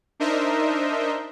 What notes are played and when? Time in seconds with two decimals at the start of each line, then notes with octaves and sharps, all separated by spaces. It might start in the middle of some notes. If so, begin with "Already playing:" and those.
0.20 D4 D#4 A#4 C5 D#5 E5